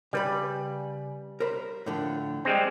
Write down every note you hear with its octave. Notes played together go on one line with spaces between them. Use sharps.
C#3 G3 B4 B5
A#4 C5 B5
A2 D3 F3
G3 G#3 C4